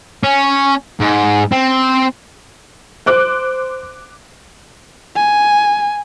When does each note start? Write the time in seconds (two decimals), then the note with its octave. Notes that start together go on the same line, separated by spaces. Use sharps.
0.24 C#4
1.00 G#2
1.52 C4
3.06 C5 D6 F#6
5.16 G#5